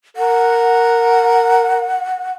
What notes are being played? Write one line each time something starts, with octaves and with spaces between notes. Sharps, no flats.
A#4 F#5